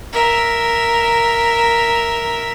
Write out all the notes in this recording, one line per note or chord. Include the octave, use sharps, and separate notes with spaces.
A#4 E5